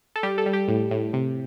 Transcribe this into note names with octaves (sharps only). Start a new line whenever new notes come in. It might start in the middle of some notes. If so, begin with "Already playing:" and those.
A4
G3 G4
A4
G3
G4
A2
A2
C3